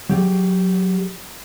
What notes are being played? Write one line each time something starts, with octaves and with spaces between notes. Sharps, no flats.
F#3 G4 G#4